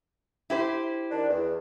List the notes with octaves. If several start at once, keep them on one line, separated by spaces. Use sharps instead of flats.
E4 G4 C5
D#3 D4
E2